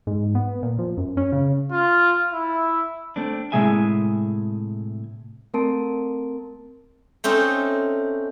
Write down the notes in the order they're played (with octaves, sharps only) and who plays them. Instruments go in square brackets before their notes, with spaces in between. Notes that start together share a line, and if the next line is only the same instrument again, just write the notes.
[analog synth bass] G#2
B3
A#2
F3
F#2
C#4
C#3
[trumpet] F4
E4
[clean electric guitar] A3 C4 D4
A2 C3 G#3 G#4 E5 G#5
[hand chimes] A3 C4 A#4 A5 C6 D7
[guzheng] A3 C4 C#4 D#4